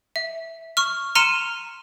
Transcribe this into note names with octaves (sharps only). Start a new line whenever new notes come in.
E5
C#6 F6
A#5 C6 F6 C#7 D#7 E7